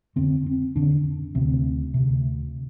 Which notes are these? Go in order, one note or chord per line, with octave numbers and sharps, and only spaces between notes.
F2 D3 C4
C4
F2 D3 D4
D2 C3 C4
D2 C3